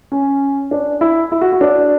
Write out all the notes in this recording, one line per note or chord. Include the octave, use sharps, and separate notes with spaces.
C#4
D4
E4
E4
F#4
F#4
D4